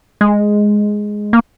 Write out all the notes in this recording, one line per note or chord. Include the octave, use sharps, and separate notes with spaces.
G#3
A#3